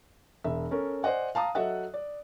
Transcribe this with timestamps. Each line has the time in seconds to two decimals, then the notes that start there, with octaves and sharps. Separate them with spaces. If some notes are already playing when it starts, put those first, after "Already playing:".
0.44 E1 E5
0.71 C#4 A4 A#4
1.03 C5 D5 D#5 F#5 G#5
1.35 F5 A5 A#5 D#6
1.55 F#3 A4 D#5 E5 F#5 F#6
1.94 D5